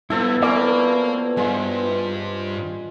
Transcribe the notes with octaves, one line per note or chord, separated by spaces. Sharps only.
G2 F3 B3 E4 A4 E6
A#3 C4 C#4 A4 B4 D5
G2 G#3 F4